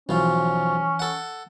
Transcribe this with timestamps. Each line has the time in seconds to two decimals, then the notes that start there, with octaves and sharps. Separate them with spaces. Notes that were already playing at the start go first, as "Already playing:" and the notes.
0.09 B1 E3 F3 C#4
0.99 A4 F#5